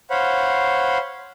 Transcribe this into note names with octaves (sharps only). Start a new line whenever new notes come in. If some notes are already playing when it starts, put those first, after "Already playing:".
C5 C#5 F5 F#5 B5